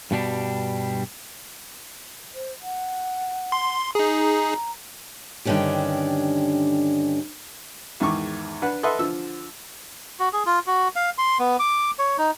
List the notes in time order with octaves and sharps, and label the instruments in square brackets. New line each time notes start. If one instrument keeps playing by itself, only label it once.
[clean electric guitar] G2 B2 G3 D4
[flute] C5
F#5
[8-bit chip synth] C6
[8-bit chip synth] D#4 G#4 [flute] A#5
[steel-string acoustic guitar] G2 D3 D#3 C#4 D4 G4
[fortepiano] E2 G#2 D#3 C#6 D6
D4 B4 F#5
A4 B4 D#5 E5 F#5 C6
D3 F3 E6
[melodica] F#4
G#4
F4
F#4
F5
C6
B3
D6
C#5
D#4